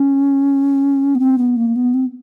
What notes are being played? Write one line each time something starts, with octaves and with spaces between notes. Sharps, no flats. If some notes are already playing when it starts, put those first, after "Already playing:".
Already playing: C#4
B3
C4
B3
A#3
B3
C4